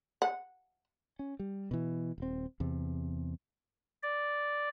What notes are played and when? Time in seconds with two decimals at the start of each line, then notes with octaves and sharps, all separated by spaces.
0.22 F#5
1.19 C#4
1.39 G3
1.71 B2 E3
2.18 D#1 C4
2.60 E2 C3
4.03 D5